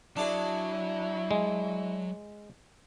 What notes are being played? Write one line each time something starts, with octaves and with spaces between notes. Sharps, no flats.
F#3 D4 E4 G#4
G#3